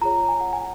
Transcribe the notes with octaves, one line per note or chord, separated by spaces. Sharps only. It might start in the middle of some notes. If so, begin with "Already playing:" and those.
F4 G#4 C#5 A#5
G#5
F#5
G#5